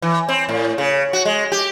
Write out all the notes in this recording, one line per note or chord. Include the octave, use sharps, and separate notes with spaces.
E3
C4
A2
C#3
F#4
G#3
G4